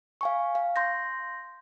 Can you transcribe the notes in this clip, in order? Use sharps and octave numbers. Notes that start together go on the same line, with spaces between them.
F5 G#5 C#6
F5
C6 G6 A#6